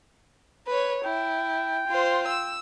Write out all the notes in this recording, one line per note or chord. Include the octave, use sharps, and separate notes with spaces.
B4 C#5
E4 G5
F4 C5
E6